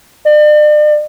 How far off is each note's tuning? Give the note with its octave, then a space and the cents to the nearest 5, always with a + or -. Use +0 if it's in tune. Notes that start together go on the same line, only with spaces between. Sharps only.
D5 +40